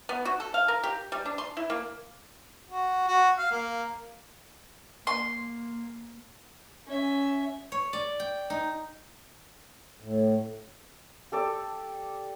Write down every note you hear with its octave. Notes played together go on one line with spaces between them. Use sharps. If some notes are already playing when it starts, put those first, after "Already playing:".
B3
F#4
A4
F5
A#4
G4
G3
D4
C6
E4
A#3
F#4
F#4
F5
A#3
A#3 C6
C#4 E5
C#5
D5
G5
D#4
A2
G4 A4 D5